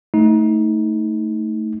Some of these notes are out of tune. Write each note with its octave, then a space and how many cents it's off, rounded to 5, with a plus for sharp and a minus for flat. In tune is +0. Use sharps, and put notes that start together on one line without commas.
A3 +10 D#4 +25